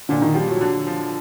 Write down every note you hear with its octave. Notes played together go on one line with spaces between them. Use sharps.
A#2 D3 D4
D#3 D#4
F3 G3 G4
F#3 F#4
D3
F3